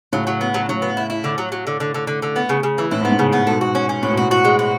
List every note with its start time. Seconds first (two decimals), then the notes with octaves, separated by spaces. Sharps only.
0.13 A2 C#3 F#3
0.27 F#3
0.41 B3
0.54 F#3
0.69 A2 F#3
0.82 B3
0.97 E4
1.10 E4
1.24 D3
1.38 F#3
1.52 F#3
1.67 D3
1.80 D3
1.95 D3
2.07 D3
2.22 D3
2.36 B3
2.49 C#3
2.63 C#3
2.78 E3
2.91 A2 E4
3.01 G#2 B3
3.12 A2
3.19 C#3
3.33 B3
3.47 G#2 B2 A4
3.61 F#4
3.75 C#4
3.89 C#4
4.03 A2 F#4
4.11 B2
4.17 A2 F#4
4.31 F#4
4.45 G#3
4.59 F#4